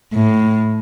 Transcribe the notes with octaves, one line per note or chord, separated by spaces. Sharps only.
A2